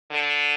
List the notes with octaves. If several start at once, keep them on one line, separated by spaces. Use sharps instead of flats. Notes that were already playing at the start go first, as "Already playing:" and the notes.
D3